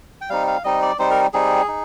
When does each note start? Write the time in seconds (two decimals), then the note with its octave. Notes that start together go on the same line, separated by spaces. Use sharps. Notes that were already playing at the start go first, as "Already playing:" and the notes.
0.21 G5
0.30 G3 C4 D#4 F5
0.47 F5
0.64 G3 C4 D#4 D#5
0.82 D5
0.99 G3 C4 D#4 C5
1.10 A#4
1.34 G3 C4 D#4 G#4
1.68 D#4